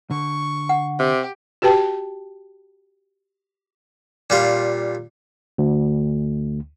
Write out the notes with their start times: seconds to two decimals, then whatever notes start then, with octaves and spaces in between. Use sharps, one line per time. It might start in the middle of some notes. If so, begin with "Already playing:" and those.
0.11 D3 C#6
0.69 F#5
1.00 C3 G4
1.62 F#4 G4 B4 G5 A5
4.30 A#2 G3 F4
5.58 D2